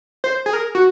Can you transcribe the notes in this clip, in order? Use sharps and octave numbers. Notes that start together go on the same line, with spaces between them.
C5
G#4
A#4
F#4